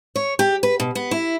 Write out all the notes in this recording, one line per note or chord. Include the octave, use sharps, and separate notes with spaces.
C#5
G4
B4
B2
B3
E4